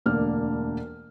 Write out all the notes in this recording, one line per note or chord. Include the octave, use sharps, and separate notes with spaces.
E1 D2 A#3 D4 F6